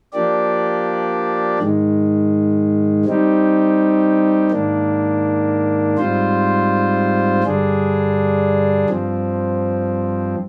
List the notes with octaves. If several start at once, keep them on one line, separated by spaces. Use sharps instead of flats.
F3 A#3 D4 G4 D5
G#2 D#3 G#3
G3 C4 D#4 G4
G#2 D#3 A#3 D4
G#2 G3 C4 F4 C5
G2 D3 G3 D4 G#4
G2 F3 C4